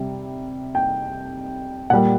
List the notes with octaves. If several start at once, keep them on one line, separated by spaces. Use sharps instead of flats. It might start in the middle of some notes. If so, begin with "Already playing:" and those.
Already playing: C3 G3
G5
A#2 G3 F#5